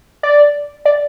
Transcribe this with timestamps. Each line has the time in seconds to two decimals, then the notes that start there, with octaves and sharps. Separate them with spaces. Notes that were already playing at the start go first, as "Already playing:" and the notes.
0.23 D5
0.85 D5